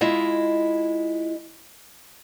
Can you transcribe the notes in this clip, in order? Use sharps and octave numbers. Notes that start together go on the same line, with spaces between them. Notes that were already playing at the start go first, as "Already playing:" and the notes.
G#3 E4 F4 D#5